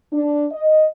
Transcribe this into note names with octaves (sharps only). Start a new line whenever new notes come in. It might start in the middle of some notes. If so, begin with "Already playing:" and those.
D4
D#5